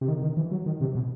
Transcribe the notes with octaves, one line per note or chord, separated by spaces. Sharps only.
C3
D#3
D#3
E3
F#3
D#3
C3
B2